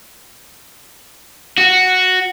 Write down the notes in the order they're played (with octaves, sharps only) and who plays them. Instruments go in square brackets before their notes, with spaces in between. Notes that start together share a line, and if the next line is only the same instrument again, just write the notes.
[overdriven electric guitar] F#4